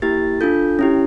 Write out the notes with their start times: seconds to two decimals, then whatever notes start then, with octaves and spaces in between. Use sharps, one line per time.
0.02 A#3 E4 G4 A6
0.41 D4 F4 A4 G6
0.79 C#4 E4 G4